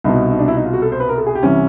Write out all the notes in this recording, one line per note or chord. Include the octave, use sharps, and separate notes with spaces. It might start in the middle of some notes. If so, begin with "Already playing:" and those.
C2 B2 D#4
D#4
D4
E4
D#4
F4
F#4
A4
C5
B4
A#4
A4
G#4
G4
C2 C3 E3 C#4